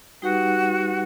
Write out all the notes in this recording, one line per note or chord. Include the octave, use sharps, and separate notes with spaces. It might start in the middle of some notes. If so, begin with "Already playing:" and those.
G3 D#4 F#4 G4 B4 F#5